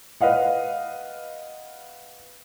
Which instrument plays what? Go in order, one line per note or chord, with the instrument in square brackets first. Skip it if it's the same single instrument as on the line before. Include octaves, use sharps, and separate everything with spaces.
[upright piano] B4 D#5 F5 F#5